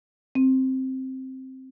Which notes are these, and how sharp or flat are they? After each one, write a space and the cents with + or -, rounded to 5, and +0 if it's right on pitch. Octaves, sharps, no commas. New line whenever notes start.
C4 +5